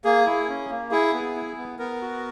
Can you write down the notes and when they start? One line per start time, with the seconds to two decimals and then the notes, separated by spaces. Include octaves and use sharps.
0.04 A#3 G#4
0.26 E4
0.49 C#4
0.70 A#3
0.91 E4 G#4
1.13 B3
1.36 E4
1.58 B3
1.79 B3 A#4
2.02 F#4